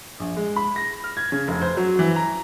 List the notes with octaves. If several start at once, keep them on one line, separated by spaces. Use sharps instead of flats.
A#1
G#3
B5
A#6
F6
G#6
C#3
F1
C5
F#3
E3
A#5